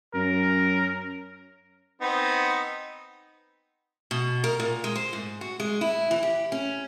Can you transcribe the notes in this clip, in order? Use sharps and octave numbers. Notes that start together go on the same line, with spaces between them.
F#2 C#4 A#4
B3 C4 D#4
B2
A#4
A#2
G#3
C5
G#2
F#4
G#3
E4
E3
G4
C#4